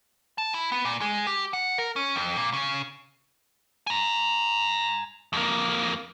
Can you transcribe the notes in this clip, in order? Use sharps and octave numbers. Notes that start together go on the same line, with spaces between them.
A5
E4
B3
A#2
G#3
G4
F#5
A#4
C#4
F2
A#2
C#3
G#5 A#5
F2 A#3